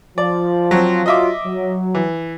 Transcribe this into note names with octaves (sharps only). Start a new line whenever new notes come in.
F3 D5
F#3 C4
F#3 F4 D#5 E5 D6
F#3
E3